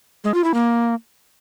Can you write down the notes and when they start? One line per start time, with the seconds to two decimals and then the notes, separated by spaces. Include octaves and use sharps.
0.24 G#3
0.34 F4
0.44 E4
0.54 A#3